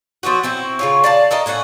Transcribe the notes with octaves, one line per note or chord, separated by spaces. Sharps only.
F3 F#3 B3 F#4
C4 E4 F#4
C#3 F4 C#5
D5 F5 A5
A4 A#4 D#5
A2 C#4 D4 F#5